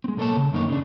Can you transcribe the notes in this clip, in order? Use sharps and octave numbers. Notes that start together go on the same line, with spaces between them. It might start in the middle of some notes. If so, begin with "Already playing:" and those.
G#3 C4
B1 A#3 A4 B4 C#5 A5
C#3
F#2 D#3 A#3 B3 D#4 C#5
C#3 D4